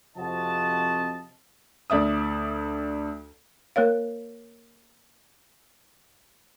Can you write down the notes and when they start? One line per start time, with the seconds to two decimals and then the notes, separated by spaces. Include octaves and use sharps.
0.17 F2 C3 F3 F#4 D#5 A5
1.90 D2 D5 E5 D#6
3.76 A#3 A#4 C#5 F5